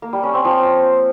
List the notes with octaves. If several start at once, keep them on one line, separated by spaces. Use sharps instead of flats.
A#3
G3
C#4
C4
F3